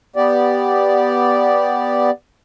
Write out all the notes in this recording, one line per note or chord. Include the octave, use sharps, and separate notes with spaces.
B3 G4 D5